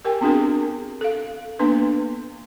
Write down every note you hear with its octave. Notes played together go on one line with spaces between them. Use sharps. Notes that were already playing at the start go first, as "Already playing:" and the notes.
G4 A#4 G5 G#5
B3 C4 D4 F#4 G#4 A#4
A4 F5
A#3 B3 D4 B4